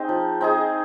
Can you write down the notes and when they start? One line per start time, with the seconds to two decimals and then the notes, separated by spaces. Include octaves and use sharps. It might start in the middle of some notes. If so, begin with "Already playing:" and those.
Already playing: C4 D#4 G#4
0.09 F3
0.41 C4 D#4 G#4